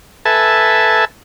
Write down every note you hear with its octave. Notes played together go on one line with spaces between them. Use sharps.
A4 B4 E5 G#5 A5